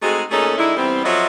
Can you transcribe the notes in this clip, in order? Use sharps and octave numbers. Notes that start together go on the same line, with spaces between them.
G#3 A3 C4 D#4 F#4 G#4
A#2 A3 C#4 D#4 G#4 A4
D3 G#3 D#4 E4
E3 G3 B3 C4
F3 F#3 F4 A4 D#5 E5